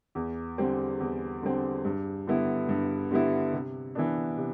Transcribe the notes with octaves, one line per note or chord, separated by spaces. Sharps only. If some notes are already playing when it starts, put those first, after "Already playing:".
E2
D3 G3 C4
E2
D3 G3 C4
G2
D3 G3 B3 E4
G2
D3 G3 B3 E4
C3
E3 B3 D4
C3